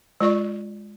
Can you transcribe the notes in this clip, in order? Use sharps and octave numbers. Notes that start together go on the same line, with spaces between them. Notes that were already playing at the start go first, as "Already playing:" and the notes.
G#3 F4 D5 C#6